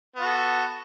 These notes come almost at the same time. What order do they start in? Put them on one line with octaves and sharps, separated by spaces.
B3 F#4 A4